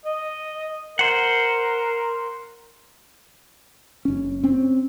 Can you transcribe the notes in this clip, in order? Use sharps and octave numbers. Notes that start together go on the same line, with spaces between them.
D#5
A#4 C5 F#5
F#1 C#4
C4 C#4